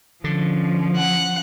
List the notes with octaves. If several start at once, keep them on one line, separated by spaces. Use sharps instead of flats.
D3 F3 C#4
F#5